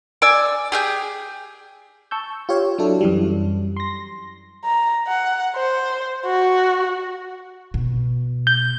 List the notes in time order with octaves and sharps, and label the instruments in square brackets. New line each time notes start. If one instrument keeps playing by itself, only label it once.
[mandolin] D5 G#5 E6
G4 G#4 G6
[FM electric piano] A5 C#6 E6 G6
F4 G4 C#5 F5
F#3 D4 E4 A4
F#2 E3 G3
C6 A#6
[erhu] A#5
F#5
C5
F#4
[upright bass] B2
[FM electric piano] G6